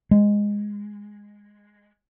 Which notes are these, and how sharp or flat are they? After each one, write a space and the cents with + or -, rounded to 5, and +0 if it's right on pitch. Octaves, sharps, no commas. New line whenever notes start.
G#3 -10